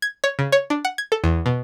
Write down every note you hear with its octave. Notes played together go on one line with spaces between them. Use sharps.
G#6
C#5
C#3
C#5
D4
F#5
G#6
A4
E2
B2